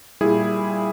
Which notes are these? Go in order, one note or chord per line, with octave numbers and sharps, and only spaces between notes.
A#2 G3 E4 G#4